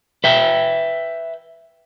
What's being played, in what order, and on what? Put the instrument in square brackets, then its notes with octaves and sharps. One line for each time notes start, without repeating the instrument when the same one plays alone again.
[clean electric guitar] B4 E5 G5